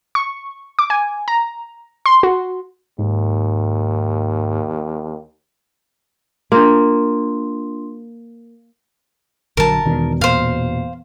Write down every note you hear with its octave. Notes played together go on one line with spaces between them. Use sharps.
C#6
D6
G#5
A#5
C6
F#4
D#2 G#2
A#3 D4 F4 C6
A#1 D3 F#3 A#4 A5
E1 D#3
A#2 C5 F5